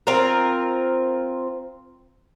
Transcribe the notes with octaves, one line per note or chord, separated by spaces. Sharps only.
C4 F4 A#4